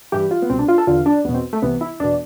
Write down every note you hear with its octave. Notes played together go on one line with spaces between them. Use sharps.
G2 E3 G4
F4
B3
C2 B2 C4
D4
F4
A4
E2 D3 F4
D4
E2 B2 B3
C4
A3
C2 C3 E3 B3
E4
E2 B2 D4